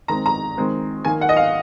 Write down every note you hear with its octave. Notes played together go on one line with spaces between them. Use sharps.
D#3 G#3 C4 A#5
A#5
D#3 G#3 C4
D#3 A#3 G#5
F#5
D#5
F5